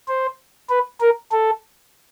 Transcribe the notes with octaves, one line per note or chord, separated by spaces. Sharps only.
C5
B4
A#4
A4